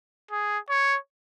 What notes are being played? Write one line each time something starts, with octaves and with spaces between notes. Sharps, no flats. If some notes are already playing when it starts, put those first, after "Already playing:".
G#4
C#5